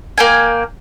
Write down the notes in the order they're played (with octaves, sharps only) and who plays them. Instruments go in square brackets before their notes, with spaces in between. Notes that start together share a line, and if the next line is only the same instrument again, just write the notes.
[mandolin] A#3 G5 G#5